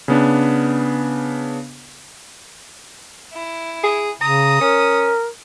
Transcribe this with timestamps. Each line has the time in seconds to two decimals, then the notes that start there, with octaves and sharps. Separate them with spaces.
0.08 C#3 B3 D4
3.33 E4
3.84 G#4
4.21 C#3 A#5 D#6
4.61 C#4 A#4